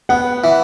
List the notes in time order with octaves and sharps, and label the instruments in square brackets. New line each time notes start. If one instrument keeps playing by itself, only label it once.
[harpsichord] B3 [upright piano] F#5
[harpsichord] E3